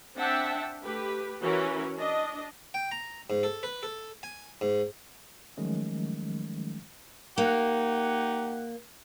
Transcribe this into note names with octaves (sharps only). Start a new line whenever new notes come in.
C4 D4 E5 F#5 G5 A5
A3 G4 B4
E3 C#4 F#4 A#4
D4 D#5
G5
A#5
G#2
A4
B4
A4
G#5
G#2
D#3 F3 F#3 G#3 A3 C#4
A#3 D#4 G4 F#5